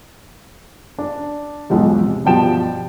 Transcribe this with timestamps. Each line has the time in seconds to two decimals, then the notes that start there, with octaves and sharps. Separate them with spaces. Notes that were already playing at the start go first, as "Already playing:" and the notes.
0.99 D4
1.70 B1 E2 F3 G#3
2.02 C3
2.25 G2 B2 F3 G5 A5 E7